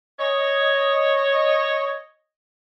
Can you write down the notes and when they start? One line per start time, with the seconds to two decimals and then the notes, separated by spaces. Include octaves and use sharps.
0.19 C#5 D#5